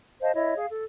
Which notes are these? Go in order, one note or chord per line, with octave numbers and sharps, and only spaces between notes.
C5 D#5 F5 A5
E4 C#5 D#5 E5
G#4 F5
A4